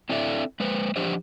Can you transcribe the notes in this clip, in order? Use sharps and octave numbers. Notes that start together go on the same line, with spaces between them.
C4 D4 E4 A4 D5 E5
G#3 B4 C5
F3 D4 G4 C5 D#5